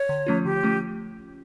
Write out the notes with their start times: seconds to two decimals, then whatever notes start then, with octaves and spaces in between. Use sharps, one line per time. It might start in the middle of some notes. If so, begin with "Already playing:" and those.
Already playing: C#5
0.09 D3
0.27 F3 A3 C#4 F4
0.45 D3 G4
0.63 F3 A3 C#4 F4